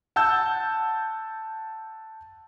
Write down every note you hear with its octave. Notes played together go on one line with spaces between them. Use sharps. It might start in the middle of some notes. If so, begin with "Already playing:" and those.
F#5 A5 E6 G6